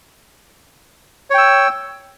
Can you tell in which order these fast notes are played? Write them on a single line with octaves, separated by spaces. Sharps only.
C#5 G5 E6